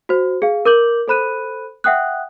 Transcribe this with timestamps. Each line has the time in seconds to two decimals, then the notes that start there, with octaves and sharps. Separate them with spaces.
0.09 F#4 C5
0.42 G#4 F5
0.65 A#4 D6 G6 F#7
1.08 A4 C5 B5 F#6 D#7
1.84 E5 F#5 G5 D#6 F#6